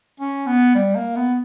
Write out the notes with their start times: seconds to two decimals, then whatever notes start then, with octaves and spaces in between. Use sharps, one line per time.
0.20 C#4
0.47 B3
0.75 G3
0.95 A#3
1.16 B3